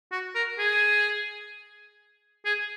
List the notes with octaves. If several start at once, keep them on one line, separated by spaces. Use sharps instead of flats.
F#4
A#4
G#4
G#4